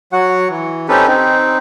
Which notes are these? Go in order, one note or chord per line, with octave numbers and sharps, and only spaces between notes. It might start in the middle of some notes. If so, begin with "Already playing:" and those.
F#3 F#4 F#5
E3
C4 C#4 D#4 G4 A4 B4
C4 D#4